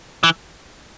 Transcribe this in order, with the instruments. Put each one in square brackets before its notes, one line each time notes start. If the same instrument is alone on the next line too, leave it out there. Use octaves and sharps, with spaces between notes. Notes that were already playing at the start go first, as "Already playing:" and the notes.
[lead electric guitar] E3